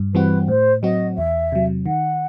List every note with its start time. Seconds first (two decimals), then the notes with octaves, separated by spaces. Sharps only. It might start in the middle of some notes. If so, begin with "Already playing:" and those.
Already playing: G2
0.14 E3 G3 C4 F#4 B4
0.48 A2 C5
0.83 F#3 C4 F#4 D#5
1.17 E2 E5
1.52 C3 F#3
1.86 D#3 F#5